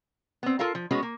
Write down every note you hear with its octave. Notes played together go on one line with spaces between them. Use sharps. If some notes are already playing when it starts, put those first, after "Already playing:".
B3 C4
F4 A4 A#4 F5 A5
F3
G#3 B3 C#4 F#4 C#5
A#3